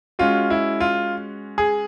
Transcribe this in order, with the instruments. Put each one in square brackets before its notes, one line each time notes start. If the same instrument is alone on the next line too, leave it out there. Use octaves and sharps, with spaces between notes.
[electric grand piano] G#3 C#4 F#4 [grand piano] F4
[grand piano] E4
F4
G#4